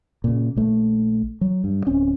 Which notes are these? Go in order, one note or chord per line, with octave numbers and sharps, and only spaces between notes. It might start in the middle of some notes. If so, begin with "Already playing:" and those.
A#2 C#3
A#1 A3
F#3
G2
D1 C4 C#4